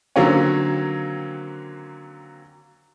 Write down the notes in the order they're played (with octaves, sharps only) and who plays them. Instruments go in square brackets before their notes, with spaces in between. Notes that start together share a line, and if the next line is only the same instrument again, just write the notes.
[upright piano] D3 D#3 F#3 A#3 C4 C#4